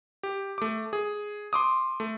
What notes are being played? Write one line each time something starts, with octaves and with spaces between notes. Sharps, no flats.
G4
A3 D6
G#4
C6 D6 D#6
A3